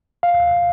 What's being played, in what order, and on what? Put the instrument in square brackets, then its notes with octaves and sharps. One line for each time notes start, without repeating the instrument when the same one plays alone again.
[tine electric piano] F5